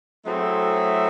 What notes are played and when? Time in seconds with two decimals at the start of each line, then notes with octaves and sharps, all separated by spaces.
0.24 F#3 A3 C4 E4 G#4